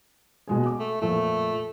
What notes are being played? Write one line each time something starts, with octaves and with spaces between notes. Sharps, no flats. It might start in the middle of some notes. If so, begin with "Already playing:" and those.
B2 G#3 G#4
D6
A3
F2 A#2 A3